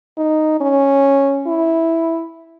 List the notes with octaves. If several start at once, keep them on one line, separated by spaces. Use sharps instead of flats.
D#4
C#4
E4